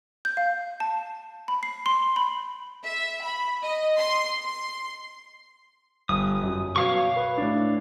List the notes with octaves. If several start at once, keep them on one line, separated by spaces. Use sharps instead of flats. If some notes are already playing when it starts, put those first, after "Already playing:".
G6
F5
A5
B5
C7
C6
B5
E5
B5
D#5
C6
C6
G1 D#6
F#2
B2 C#5 F5 C#6
B4
A2 D4